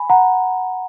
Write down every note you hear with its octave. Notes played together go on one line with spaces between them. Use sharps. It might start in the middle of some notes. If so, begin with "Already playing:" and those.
Already playing: G#5 B5
F#5 A#5